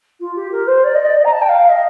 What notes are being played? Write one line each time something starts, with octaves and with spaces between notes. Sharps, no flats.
F4
G4
A#4
C5
D5
D#5
D5
D#5
A#5
A5
G5
F5
D#5